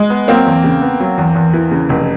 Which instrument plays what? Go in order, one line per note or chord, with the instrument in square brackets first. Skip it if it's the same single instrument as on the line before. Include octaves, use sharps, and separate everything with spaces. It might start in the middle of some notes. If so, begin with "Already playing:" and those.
Already playing: [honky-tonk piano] G#3
[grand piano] B3
[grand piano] F#3 [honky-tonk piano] A#3 C4
[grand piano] E2
C#3
B3
F#3
E2
E2
E3
C#3
F1